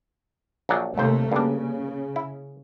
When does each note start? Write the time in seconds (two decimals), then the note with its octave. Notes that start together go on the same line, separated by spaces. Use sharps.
0.69 A#1 F#3 D4
0.98 D#2 C3 A3 A#3 C5
1.32 G2 C#3 D4
2.16 E4